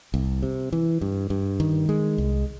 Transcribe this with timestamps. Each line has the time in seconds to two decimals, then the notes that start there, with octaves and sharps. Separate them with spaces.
0.14 C2
0.43 C3
0.73 E3
1.01 G2
1.30 G2
1.60 D#3
1.89 G#3
2.18 C2